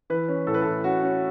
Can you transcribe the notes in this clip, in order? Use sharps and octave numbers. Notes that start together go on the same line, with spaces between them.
E3 B4
C#4
A2 A4
B4
A2 A4
C#4 F#4
C#4